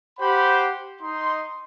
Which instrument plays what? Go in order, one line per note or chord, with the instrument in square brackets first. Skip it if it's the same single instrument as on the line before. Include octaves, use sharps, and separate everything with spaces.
[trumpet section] G4 C5 F#5 B5
D#4 C6